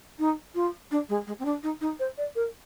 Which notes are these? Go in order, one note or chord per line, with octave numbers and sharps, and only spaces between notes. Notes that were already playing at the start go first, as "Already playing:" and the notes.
D#4
F4
D4
G#3
G#3
C4
D4
D#4
D#4
C5
D5
A#4